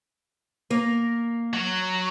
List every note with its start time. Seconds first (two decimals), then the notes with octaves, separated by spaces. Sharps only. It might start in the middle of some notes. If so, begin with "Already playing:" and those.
0.70 A#3 A#4
1.53 F#3